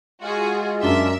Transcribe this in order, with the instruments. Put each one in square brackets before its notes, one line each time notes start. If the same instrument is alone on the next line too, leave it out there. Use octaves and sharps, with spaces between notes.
[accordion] G#3 F4 [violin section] F#4 G#4
[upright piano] F#2 G7 [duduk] D4 [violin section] A#4 E5